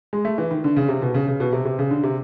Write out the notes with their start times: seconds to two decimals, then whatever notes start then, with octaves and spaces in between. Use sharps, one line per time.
0.13 G#3
0.25 A3
0.38 E3
0.51 D#3
0.64 D3
0.76 C#3
0.88 C3
1.02 B2
1.14 C#3
1.28 C#3
1.40 B2
1.53 C3
1.65 C3
1.79 C#3
1.91 D3
2.03 C3